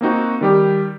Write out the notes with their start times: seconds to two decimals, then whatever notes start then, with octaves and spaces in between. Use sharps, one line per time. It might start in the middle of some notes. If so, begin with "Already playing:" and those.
0.01 A#3 C4 D#4 F#4
0.41 D#3 G3 G4